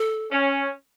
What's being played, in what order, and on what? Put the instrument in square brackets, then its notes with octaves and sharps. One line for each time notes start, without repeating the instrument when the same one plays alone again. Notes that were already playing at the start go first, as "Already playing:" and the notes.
Already playing: [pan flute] A4
[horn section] C#4